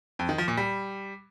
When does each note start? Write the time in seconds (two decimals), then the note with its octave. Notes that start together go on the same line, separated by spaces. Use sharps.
0.19 F2
0.29 D#3
0.38 F3
0.48 A#2
0.57 G3